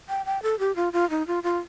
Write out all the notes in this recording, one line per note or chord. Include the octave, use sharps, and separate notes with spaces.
G5
G5
A4
G4
F4
F4
D#4
F4
F4